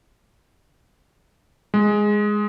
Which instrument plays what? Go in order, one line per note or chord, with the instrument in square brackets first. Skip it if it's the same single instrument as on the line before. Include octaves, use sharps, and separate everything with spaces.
[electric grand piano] G#3